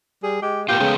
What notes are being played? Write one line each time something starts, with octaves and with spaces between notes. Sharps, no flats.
G3 G#4
G#3 G4
A#3 B3 F4 G4 G5
C#3 G#3 A3 B3